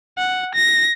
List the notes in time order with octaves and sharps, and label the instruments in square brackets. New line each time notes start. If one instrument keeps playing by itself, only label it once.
[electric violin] F#5
A#6